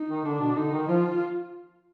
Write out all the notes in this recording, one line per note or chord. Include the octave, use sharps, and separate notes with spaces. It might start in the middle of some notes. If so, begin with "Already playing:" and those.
Already playing: D#4
D#3
D3 D4
B2
D3 D#4
D#3
F3 F4